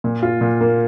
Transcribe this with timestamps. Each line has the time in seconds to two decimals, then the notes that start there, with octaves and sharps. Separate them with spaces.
0.04 A#2
0.23 F4
0.41 A#2
0.61 A#3